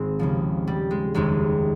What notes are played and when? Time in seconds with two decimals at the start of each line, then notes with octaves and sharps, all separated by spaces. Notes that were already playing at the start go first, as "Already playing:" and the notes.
Already playing: G#1 G#2 D#3 G#3 C4
0.19 D#2 C#3 F3
0.67 G3
0.91 G#3
1.14 F1 D#2 D#3 G#3